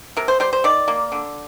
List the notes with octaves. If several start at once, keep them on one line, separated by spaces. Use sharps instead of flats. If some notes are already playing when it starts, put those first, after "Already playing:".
C3 A#4
C5
G3 C5
C5
D#3 D5
A#3
D3